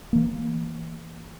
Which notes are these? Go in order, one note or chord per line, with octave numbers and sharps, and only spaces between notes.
E3 A#3